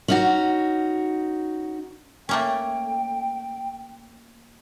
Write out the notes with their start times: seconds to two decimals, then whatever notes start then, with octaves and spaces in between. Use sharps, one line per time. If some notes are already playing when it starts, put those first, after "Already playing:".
0.08 C#4 D#4 F#4
2.29 A3 A#3 C#4 G5